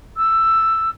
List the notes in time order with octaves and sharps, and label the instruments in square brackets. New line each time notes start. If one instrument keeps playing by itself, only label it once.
[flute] E6